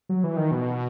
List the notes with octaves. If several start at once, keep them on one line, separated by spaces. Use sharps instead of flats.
F#3
E3
D#3
B2